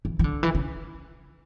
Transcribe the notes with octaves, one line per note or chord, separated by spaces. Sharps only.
E3
E3
D3
E3
C#3